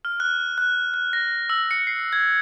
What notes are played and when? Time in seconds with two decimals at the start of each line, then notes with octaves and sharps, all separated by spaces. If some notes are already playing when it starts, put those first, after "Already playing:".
0.05 F6
0.20 F#6
0.58 F#6
0.94 F#6
1.13 A#6
1.50 E6
1.71 C#7
1.87 C7
2.13 G#6